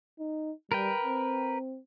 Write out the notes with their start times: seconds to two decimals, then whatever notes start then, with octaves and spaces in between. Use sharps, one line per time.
0.19 D#4
0.72 G3 A#4 B4 G5
1.04 C4